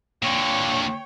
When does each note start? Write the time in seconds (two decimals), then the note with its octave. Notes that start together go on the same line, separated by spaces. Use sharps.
0.22 A#2 D3 C#5 G5